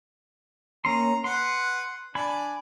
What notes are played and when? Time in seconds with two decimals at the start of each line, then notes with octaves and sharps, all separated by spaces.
0.85 A#3 C#4 A#5 C6
1.24 B4 F#5 C6
2.15 D4 D5 G#5 B5